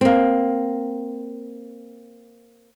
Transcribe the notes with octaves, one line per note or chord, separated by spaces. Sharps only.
A#3 C4